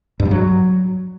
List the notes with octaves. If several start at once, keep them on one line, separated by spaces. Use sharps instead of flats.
G2
G3
F#3